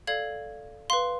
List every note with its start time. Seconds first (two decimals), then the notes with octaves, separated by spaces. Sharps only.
0.07 A4 D5 F5 G#6
0.90 B4 F5 C6